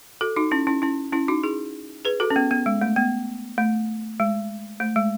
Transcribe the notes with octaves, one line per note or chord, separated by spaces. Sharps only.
F#4 A4
D#4 F#4
C#4 E4
C#4 E4
C#4 E4
C#4 E4
D#4 F#4
E4 G#4
G#4 B4
F#4 A4
C#4
B3
B3
G#3
A3
B3
A3
G#3
A3
G#3